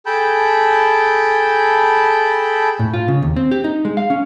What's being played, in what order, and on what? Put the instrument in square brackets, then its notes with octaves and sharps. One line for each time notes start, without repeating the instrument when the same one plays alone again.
[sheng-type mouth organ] G#4 A4 G5 A5 B5 G6
[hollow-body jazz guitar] A2
F4
C#3
D#2
C4
G4
D#4
G#3
F5
C#4